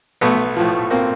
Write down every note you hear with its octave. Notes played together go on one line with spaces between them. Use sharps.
B1 A3 B3
A2 F3
A#3 C4